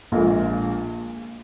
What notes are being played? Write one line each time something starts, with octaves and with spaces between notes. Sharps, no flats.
A#1 A#2 G#3